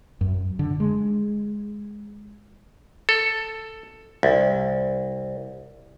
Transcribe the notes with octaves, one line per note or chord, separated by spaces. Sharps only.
F#2
D3
G#3
A4
C2